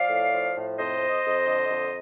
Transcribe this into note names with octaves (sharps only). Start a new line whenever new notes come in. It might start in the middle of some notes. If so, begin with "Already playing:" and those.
Already playing: F3 D5 F5
A2
F3
A2
F2 C5 D#5
F2
F2
D3
F2